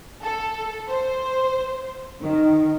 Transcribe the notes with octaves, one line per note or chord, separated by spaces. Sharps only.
A4
C5
D#3